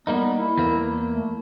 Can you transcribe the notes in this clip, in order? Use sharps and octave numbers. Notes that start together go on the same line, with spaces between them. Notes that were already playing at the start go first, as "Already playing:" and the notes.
G3 A#3 B3 D#4
E4
E2 A#3
A3